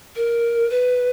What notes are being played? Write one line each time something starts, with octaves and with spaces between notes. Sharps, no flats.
A#4
B4